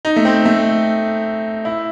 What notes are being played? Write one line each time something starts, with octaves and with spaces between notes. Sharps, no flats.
D#4
A3
C4
A3
E4